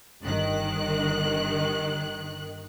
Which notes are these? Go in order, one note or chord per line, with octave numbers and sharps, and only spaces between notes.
G1 D#3 F#6